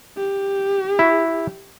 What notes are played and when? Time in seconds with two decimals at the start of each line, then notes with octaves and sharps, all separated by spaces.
0.17 G4
0.99 E4